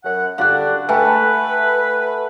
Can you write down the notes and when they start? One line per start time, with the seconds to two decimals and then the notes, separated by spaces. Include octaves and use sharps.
0.04 F#2 F#5
0.38 D3 G3 D4 F#4 F5 F#5 F#6
0.89 A3 B4 G5 G#5